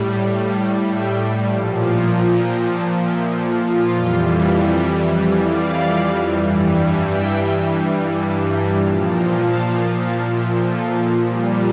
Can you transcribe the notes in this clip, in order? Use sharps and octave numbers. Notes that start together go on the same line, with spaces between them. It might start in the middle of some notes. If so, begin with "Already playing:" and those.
Already playing: A2 G3
F5 A5
E5 G5
A#2 F3 D5 F5
F5 A5
G5 A#5
G5 A#5
F5 A5
E5 G5
F4 A4
F4
F2 E3 G3
D5 F5
G2 E3 G3
E5 G5
F5 A5
G5 A#5
A#2 F3 F5 A5
G5 A#5
F5 A5
F5 A5
E5 G5
F4 A4
A#2 G3 G4